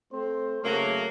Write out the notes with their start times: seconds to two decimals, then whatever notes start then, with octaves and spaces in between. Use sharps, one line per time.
0.12 A3 C4 C5
0.64 C#3 F#3 A3 A#3